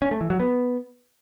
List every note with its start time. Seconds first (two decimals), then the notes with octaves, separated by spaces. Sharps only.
0.02 C#4
0.11 A3
0.21 E3
0.30 F#3
0.40 B3